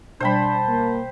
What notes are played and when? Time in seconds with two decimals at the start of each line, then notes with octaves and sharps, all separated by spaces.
0.20 B2 G3 D4 C5 G5 A5 B5
0.68 A#3